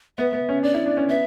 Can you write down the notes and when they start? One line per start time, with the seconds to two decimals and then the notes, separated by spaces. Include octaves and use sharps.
0.18 B3 E5
0.33 B3
0.49 C#4
0.63 D4 D5
0.74 E4
0.86 D4
0.97 C#4
1.09 B3 E5